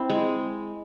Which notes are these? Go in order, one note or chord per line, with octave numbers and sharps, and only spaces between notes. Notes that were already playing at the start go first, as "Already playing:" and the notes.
Already playing: C4 E4
G#3